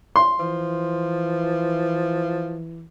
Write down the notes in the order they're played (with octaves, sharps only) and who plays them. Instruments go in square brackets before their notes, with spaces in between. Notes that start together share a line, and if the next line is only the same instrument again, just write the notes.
[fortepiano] C6
[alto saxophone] E3 [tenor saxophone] F3